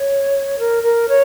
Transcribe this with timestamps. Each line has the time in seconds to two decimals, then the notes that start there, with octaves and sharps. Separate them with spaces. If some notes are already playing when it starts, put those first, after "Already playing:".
Already playing: C#5
0.59 A#4
0.83 A#4
1.09 C#5